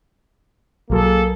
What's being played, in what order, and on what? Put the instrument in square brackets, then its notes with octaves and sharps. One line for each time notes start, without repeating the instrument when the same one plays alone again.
[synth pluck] B1 F#3 [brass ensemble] A#3 G#4 A4